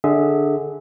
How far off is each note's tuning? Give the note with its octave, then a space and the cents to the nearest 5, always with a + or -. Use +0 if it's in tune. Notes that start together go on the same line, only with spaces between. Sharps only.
D3 +10 G#4 +0 E5 -20